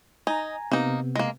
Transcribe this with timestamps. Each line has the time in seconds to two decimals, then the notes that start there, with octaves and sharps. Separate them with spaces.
0.27 D#4 G#5 A#5
0.72 C3 A#3 B3 D#4
1.16 G#3 A#3